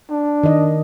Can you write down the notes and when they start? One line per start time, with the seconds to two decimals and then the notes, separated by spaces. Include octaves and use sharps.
0.10 D4
0.44 D#3 D#5